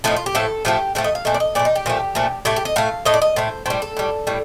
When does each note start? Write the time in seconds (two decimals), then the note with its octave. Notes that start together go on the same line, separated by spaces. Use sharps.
0.04 A2 F3 A3 D#4
0.17 F4
0.26 G4
0.35 A2 F3 A3 A4
0.65 A2 F3 A3 G4
0.95 A2 F3 A3 G4
1.04 D#5
1.15 F5
1.25 A#2 F3 A3 D#5
1.34 D5
1.40 D#5
1.55 A#2 F3 A3 D5
1.65 D#4
1.76 G4
1.86 A#2 F3 A3
2.15 A#2 F3 A3
2.45 A2 A3 G4
2.56 G4
2.65 D#5
2.76 A2 A3 F5
3.05 A2 A3 D#5
3.14 D5
3.22 D#5
3.36 A2 A3 C5
3.66 A2 G3 C5
3.82 A4
3.97 A2 G3
4.27 A2 G3